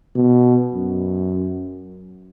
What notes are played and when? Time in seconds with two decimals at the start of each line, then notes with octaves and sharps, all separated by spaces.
0.15 B2
0.74 F#2